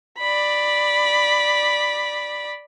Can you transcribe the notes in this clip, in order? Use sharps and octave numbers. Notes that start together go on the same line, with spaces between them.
D5 B5